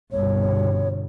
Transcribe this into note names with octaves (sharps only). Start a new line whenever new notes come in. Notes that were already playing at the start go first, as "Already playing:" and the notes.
G1 C2 B2 C#5